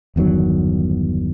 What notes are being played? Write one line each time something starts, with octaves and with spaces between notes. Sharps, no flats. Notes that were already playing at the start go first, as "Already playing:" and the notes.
G1 E2 D#3 F#3